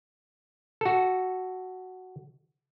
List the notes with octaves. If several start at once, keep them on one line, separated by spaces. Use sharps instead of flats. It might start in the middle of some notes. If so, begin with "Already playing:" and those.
F#4 A4